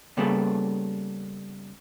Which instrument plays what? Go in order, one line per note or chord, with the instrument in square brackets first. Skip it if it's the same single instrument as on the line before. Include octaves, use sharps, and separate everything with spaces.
[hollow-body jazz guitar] C#3 G3 A#3 B3 G#4 A4